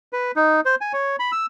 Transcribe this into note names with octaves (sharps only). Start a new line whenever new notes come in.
B4
D#4
C5
G#5
C#5
B5
E6